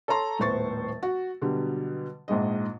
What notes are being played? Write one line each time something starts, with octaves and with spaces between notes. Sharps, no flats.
A4 C#5 A5 A#5 C6
D#1 A2 B3 C5 C#6 A6
F#4
B2 D3 F#3 G3
A#1 G#2 G#3 D#5